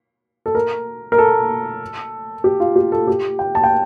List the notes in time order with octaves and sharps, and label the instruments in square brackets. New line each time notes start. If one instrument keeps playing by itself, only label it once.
[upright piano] A4
A#4
A#4
A4
G4
F4
G4
A4
G4
G5
A5
G5